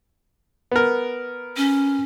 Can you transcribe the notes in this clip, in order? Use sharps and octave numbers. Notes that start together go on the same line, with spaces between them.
B3 A#4
C#4